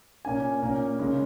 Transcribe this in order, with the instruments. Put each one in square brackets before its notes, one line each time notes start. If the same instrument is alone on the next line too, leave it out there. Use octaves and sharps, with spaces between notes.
[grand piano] A#2 A#3 C#4 G#5
A#2 A#3 C#4
C#3 G#3 C#4